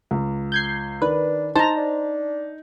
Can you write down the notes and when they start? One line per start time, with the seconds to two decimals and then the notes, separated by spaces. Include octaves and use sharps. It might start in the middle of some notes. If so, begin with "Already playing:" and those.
0.11 C#2
0.52 G6 G#6 C7
1.02 D#3 D4 B4
1.56 D#4 C5 A5 A#5
1.76 D4